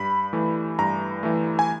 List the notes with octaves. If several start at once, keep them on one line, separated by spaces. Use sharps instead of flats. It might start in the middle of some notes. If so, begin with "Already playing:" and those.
Already playing: G2 B5
E3 A3
G2 A#5
E3 A3
G#5